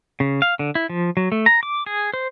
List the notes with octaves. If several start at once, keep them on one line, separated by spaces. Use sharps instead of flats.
C#3
F5
D3
E4
F3
F#3
A3
A#5
D6
G#4
C5